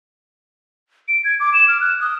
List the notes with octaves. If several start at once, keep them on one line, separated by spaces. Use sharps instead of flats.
D7
G#6
D6
E7
F6
F#6
D#6